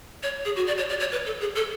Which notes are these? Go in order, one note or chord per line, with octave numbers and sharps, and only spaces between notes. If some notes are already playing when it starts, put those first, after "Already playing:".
C#5
G#4
F#4
D5
C#5
D5
C#5
B4
A4
G#4
A4